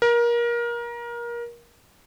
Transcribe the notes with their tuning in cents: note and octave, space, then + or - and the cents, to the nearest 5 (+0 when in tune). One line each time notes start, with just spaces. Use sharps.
A#4 +25